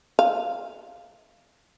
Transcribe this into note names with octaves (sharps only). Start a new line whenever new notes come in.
F5